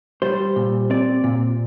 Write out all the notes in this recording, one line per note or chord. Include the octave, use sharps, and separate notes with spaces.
G3 C5
A#2
C4 D5
A#2